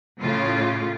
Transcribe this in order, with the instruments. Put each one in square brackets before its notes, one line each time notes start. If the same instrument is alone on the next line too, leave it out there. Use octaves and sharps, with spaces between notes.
[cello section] A2 C#3 F4